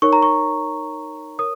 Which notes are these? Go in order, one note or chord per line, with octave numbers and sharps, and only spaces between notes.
D#4 A#4 C#5 C#6
A#5
C#6
A#4 C#5 D#6